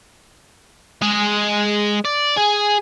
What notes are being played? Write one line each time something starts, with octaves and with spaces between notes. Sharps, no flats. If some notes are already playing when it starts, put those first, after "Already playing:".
G#3 G#4
D5
G#4